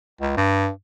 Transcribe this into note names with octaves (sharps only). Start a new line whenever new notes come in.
C#2
G2